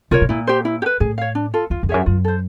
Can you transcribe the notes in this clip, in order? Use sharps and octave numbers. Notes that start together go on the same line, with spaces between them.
B2 F4 A#4 C#5
B2
A#2 E4
G4 C5
E4
G4
B4
A2 G#4
C#5 F5
D4
F4 A4
E2 F4
F2
F#2 G#4 C#5 E5
F#2 F4
A4 C5